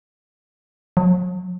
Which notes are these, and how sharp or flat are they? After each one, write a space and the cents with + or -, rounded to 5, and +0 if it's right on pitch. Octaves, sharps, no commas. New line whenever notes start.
F#3 -40